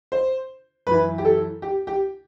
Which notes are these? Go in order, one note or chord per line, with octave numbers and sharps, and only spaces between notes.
C5
F#2 E3 B4
G4
A4
G4
G4